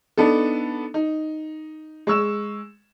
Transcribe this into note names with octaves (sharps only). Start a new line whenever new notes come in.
B3 D4 D#4 A4
D#4
G#3 C#6 E6 E7